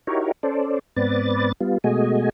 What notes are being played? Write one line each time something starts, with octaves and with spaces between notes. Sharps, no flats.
D#4 E4 F#4 G4 A#4 C#5
C#4 A4 C5 D5
G#2 B3 C4 B4 D5 A6
G3 B3 F4
B2 G#3 A3 F#4 D#5 G#5